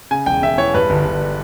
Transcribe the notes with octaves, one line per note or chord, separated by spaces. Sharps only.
C#3 G#5
E1 G5
E1 E5
E3 C#5
G2 B4
G1
G1